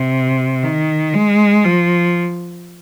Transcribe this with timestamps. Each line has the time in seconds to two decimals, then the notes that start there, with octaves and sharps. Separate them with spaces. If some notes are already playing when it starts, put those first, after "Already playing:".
Already playing: C3
0.63 D#3
1.14 G#3
1.65 F3